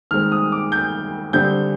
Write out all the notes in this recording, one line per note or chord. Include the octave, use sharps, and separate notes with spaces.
D#3 G#3 C4 F6
D#6
D6
G6
D3 G3 C4 G6